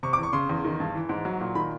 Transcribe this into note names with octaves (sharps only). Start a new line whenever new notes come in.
C3 C#6
E2 D6
C#6
C#3 C6
E2
D#3
G2
E3
G#2
F#3
A#2
D#3 B5